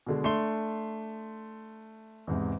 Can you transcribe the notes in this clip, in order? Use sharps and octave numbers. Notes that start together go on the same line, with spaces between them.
B2 D3 G#3
A3 D4 C6 G7
E2 G#2 C3